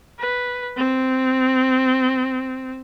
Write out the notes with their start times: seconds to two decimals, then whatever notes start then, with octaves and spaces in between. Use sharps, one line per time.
0.19 B4
0.77 C4